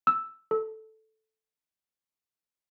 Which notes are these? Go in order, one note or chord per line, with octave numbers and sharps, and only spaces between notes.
E6
A4